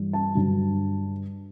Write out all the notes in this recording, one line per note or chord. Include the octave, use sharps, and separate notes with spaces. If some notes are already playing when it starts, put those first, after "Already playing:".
Already playing: G2 E3 G3
A5
G2 D3 F#3